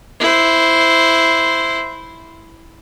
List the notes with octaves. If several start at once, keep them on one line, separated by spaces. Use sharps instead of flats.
E4 C5